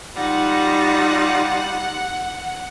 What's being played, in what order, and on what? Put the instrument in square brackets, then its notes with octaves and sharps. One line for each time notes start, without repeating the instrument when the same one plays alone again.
[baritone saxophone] G3 [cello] D#4 F4 [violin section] F#5